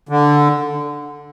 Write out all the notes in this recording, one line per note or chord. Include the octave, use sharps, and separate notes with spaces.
D3